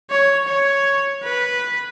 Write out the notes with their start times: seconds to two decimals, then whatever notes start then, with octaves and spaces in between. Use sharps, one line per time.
0.10 C#5
0.47 C#5
1.23 B4